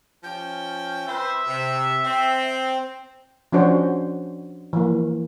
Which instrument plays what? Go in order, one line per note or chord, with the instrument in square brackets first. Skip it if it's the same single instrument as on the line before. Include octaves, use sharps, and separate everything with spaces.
[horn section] F3 C#4 G5
[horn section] C4 B4 C5 [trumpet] E5
[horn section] C3
C4
[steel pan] F3 C#4 D4 F#4 C5 C#5
E3 F3 A#3